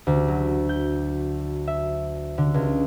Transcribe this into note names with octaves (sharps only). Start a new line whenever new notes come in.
D2
F#3
G6
E5
D3
C#2